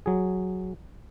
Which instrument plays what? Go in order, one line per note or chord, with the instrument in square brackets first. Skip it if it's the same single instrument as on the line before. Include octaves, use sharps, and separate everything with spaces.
[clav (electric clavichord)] F#3 G#4